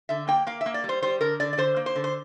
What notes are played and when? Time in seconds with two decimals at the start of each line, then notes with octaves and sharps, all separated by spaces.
0.09 D3 E5
0.28 A#3 G5
0.47 A#3 F5
0.61 E5
0.66 A#3
0.74 D5
0.84 G3
0.89 C5
1.02 G3 C5
1.21 D3 A#4
1.40 D3 D5
1.53 D5
1.58 D3 C5
1.76 A#3
1.86 C5
1.96 D3
2.04 C5